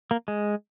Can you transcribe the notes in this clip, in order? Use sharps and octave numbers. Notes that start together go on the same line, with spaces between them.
A#3
G#3